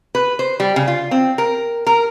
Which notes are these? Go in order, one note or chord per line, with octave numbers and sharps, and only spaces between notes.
B4
C5
G3
C#3
F4
C4
A#4
A#4